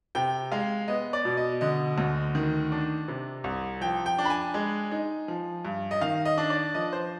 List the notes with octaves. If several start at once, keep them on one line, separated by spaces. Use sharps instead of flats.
C3 G5
G#3 F5
B3 D#5
D5
B2
D#5
D3 D#5
D2
D#3
D4
C3
C2
F3 G5
G5
D4
B5
G#5
G#3
D#4
F3
G2
D#5
D#3 F5
D#5
D4
D5
F3 D#5
C5